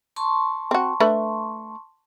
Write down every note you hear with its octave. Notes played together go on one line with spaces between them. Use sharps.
A5 C6 C#6
C4 F#4
A3 D4 B4